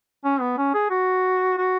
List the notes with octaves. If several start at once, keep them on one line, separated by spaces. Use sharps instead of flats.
C#4
B3
C#4
G#4
F#4
F#4